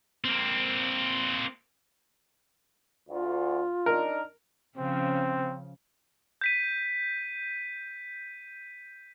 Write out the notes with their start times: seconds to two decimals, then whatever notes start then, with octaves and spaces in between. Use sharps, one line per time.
0.25 A#3 C4
3.09 D2 F4
3.86 D4 D#4 A#4
4.78 C#3 F3 C4 C#4
6.41 G6 B6 D#7